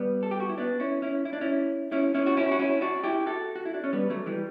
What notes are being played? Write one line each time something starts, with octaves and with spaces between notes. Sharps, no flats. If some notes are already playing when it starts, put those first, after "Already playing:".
Already playing: G3 B3
A4
G4
F#4
E4
B3 D4
C#4 E4
C#4 E4
E4
D4
C#4 E4
C#4 E4
C#4 E4
F#4
C#4 E4
F#4
C#4 E4
D4 F#4
E4 G4
F#4 A4
F#4
E4
D4
C#4
G3 B3
F#3 A3
E3 G3